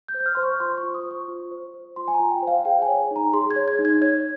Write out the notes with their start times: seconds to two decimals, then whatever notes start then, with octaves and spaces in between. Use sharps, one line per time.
0.08 G6
0.14 C5
0.20 G6
0.26 F6
0.35 C5 C6
0.43 C#6
0.60 F4 C6
0.77 C#6
0.83 F4
0.94 D#6
1.06 C5
1.11 C#6
1.28 F4
1.51 C5
1.74 C5
1.96 F4 C6
2.08 G#5
2.14 A#5
2.19 F4
2.31 G5
2.42 C5 F5
2.65 G#4 G5
2.82 G#5
2.88 C#5
3.11 D#4 A#5
3.33 G#4 C6
3.51 G#6
3.56 C#5
3.68 G#6
3.79 D#4
3.85 G#6
4.01 C#5 G#6